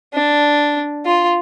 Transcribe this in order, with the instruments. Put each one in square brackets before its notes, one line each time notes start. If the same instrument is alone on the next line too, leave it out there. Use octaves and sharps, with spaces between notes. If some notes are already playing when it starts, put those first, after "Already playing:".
[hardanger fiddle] D4
F4